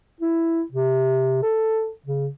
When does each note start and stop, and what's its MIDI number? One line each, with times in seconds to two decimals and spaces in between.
0.21 0.62 64
0.72 1.41 48
1.42 1.89 69
2.06 2.28 49